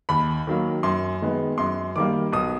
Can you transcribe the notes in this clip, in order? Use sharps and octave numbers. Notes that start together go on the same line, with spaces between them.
D#2 B5
D#3 F#3 A#3
F#2 C6
D#3 G#3 B3
F#2 C6
D#3 G3 A#3 D6
B1 D#6